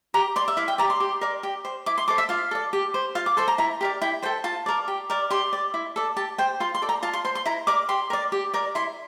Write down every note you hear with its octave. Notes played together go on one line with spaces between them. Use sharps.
G4 A#5
D5 C6
E5
E4 F5
G5
G4 D5 A#5
C6
G4
A#4 D5
G4
C5
E4 D6
C6
A4 C5 D6
E5
F4 F5
A4 D5
G4
C5
F4 F5
D6
A4 C5 C6
A#5
E4 A#5
G4 A#4 D5
E4 G5
A4 C5 G5
F4 A5
A#4 D5
G4
A#4 D5
G4 C6
D5
E4
A4 D5
G4 A5
C5 G5
F4 C6
C6
A4 D5
A#5
F4 A5
C6
C5 C6
C6
E4 A#5
A#4 D5 D6
G4 C6
A#4 D5
G4
A#4 D5
E4 C6